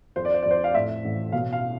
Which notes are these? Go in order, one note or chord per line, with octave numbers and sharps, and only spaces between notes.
F2 C5
D5
C5
F2 D5
C5
F5
A2 E5
A1
B2 F5
F5